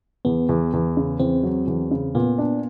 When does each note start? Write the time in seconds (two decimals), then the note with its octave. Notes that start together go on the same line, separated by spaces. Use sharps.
0.25 E2 B3
0.49 E2
0.73 E2
0.97 C#3
1.19 E2 C4
1.43 F#3
1.67 E2
1.91 C#3
2.15 A#2 B3
2.38 D4